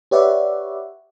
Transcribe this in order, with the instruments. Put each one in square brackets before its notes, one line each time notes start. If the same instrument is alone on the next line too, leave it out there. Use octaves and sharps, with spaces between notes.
[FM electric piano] G4 B4 C#5 D5 E5 F#5